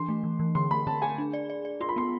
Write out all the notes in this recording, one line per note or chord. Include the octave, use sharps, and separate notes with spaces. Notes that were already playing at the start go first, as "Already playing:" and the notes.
Already playing: E3 D4 C6
A3
E3
E3
D3 C6
A3 B5
D3 A5
G#4 G#5
D4
D5
D5
D5
F4 C6
B5
B3 C6